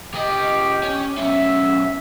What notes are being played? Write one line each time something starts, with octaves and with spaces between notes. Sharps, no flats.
C#3 G4 D#5
C#4
B1 C#4 E5